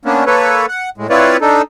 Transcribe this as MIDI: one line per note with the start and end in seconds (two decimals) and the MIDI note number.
0.05 0.24 58
0.05 0.24 59
0.05 0.24 61
0.05 0.24 62
0.26 0.66 58
0.26 0.66 69
0.26 0.66 71
0.26 0.66 73
0.68 0.90 78
0.98 1.07 45
0.98 1.07 56
1.10 1.37 60
1.10 1.37 64
1.10 1.37 65
1.10 1.37 71
1.10 1.37 73
1.10 1.37 74
1.41 1.62 62
1.41 1.62 63
1.41 1.62 69